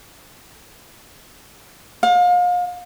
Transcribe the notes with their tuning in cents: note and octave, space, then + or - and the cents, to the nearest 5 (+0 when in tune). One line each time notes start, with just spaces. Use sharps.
F5 +35